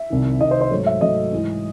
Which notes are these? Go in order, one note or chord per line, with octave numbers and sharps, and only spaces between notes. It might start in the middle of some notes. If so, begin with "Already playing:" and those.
Already playing: E5
C2 C3 D#3
C2 C3 D#3 D#5
C5
C5
G#2 F#3 A3 C#5
E5
G#2 F#3 A3 D#5
G#2 E3 G#3